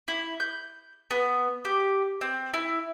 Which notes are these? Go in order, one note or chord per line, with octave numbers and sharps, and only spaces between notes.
E4
G6
B3
G4
C4
E4